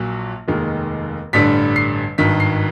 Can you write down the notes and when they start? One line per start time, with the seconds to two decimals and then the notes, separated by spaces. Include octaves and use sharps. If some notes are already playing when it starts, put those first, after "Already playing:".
Already playing: A#1 A#2 F#3
0.48 F1 D#2 D#3 G#3
1.33 A1 G2 D3 G3 B6
1.76 C7
2.18 G#1 G2 D#3 B6
2.40 C7